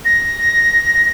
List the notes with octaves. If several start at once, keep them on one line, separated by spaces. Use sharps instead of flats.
A#6